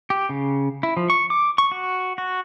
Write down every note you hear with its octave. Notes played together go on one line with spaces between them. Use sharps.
G4
C#3
E4
F3
C#6
D6
C#6
F#4
F#4